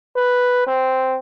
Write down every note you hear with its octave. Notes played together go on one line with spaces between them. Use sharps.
B4
C4